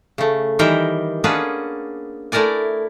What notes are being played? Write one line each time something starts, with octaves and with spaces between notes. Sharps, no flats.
C#3 A3
D#3 E3 G3 A#4 E5 G5
A#3 B3 C#4 D4 G#4 B4
A3 E4 A#4 D5 G#5